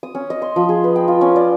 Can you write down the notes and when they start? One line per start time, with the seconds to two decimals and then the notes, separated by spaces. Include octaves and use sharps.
0.03 D#6
0.15 C#4
0.30 D#5
0.42 C6
0.56 F3
0.69 G#4
0.84 B4
0.96 G5
1.08 F4
1.21 C#4
1.36 D5